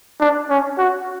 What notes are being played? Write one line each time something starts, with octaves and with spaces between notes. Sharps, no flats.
D4
C#4
F#4